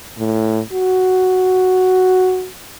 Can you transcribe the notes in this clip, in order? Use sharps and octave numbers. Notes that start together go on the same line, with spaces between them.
A2
F#4